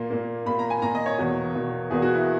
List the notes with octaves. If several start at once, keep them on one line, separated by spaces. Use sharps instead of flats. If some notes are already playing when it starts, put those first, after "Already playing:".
Already playing: A#2 A#3
A#2 A#3
A#2 A#3 B5
A#5
G#5
A#2 A#3 A#5
D#5
C#5
E2 B2 A#3
E2 B2 A#3
E2 B2 A#3 G#4
F#4
E4